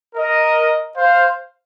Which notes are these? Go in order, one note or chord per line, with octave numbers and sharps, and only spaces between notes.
A#4 D#5
C5 F5